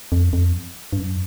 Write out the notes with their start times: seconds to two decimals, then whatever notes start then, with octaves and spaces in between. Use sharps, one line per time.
0.12 F2
0.33 F2
0.93 G2
0.98 F#2